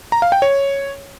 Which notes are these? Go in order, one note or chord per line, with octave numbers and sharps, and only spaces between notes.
A#5
F5
G5
C#5